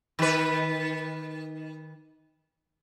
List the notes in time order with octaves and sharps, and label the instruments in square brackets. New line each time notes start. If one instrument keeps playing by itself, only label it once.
[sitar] D#3 B4